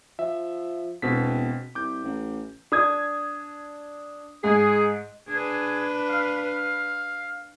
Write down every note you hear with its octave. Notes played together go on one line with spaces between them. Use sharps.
F3 E5
E1 B2 C4 B6
C2 D6 G6
A1
D4 D#6 G#6
G#2 G#4
D4 G#4 B4
F5